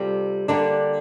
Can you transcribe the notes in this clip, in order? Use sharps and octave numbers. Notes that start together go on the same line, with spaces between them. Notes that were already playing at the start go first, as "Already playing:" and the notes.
Already playing: C3 G3 C4 F4 A4
D3 G3 A#3 D4